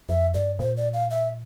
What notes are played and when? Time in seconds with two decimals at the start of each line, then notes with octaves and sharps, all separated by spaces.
0.09 F2 E5
0.34 G2 D5
0.59 A#2 C5
0.77 D5
0.94 F5
1.10 E5